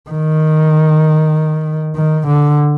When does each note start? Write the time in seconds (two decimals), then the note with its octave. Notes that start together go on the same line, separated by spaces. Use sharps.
0.10 D#3
1.96 D#3
2.27 D3